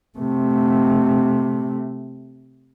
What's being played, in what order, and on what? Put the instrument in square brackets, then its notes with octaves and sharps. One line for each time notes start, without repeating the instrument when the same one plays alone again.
[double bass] C3 A3